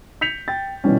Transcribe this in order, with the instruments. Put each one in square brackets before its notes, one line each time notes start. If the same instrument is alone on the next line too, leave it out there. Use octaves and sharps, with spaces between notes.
[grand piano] G6 B6 C#7 F7
G5 A6
B2 D#3 E3 G3 C#4